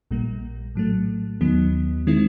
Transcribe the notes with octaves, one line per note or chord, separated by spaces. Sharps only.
A#1 A#2 G3 A#3
A2 F#3 A3
D#2 D#3 F#3 B3
D#3 G#3 C4 E4